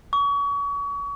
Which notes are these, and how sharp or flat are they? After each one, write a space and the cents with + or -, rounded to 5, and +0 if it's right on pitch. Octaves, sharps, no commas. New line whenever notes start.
C#6 +35